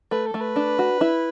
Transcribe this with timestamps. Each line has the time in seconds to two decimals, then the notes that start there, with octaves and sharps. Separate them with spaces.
0.11 A3 B4
0.26 A4
0.34 A3
0.41 B4
0.56 D4
0.79 F#4
1.01 E4